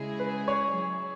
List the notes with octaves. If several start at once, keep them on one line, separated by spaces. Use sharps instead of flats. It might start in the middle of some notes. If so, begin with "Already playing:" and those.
Already playing: C#3 G#3 E4 G#4
B4
C#5
F#3 E4 G#4